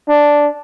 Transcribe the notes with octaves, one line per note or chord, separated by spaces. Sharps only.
D4